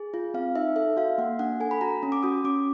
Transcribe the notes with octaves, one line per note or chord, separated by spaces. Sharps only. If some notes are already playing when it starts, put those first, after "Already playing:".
Already playing: G#4
F4
C4 F5
D#4 E5
A4 E5
F#4 F5
A#3 F#5
D4 F#5
A4 G#5
B5
F#4 A#5
C#4
D6
F#4 D#6
C#4 D6